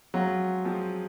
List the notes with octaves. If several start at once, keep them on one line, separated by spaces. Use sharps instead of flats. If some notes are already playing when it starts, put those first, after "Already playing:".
F#3 G#3 C4 F4 G#4
F3 G#3 C4 F4 G#4